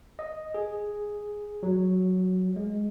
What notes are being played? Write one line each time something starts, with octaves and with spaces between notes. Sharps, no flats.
D#5
G#4
F#3
G#3